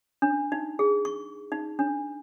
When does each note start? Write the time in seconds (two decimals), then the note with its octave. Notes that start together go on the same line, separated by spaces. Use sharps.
0.22 D4
0.52 D#4
0.79 G#4
1.05 C#6
1.52 D#4
1.79 D4